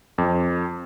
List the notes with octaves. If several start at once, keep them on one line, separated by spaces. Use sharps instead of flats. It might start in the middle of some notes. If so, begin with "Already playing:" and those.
F2